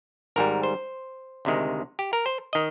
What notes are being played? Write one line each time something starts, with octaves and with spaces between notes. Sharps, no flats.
G#1 G#2 G3 A#4
C5
D2 C3 D#3 G#3
G4
A#4
C5
D#3 D#5